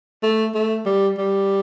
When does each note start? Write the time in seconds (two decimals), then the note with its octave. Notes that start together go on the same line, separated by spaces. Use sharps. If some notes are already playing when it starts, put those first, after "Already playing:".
0.23 A3
0.54 A3
0.86 G3
1.17 G3